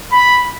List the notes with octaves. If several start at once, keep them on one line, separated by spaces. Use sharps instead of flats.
B5